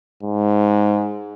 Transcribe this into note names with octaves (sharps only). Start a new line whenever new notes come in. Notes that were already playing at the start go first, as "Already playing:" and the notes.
G#2